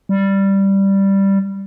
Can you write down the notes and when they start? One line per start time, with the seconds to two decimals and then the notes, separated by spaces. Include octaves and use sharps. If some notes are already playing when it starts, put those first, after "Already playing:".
0.09 G3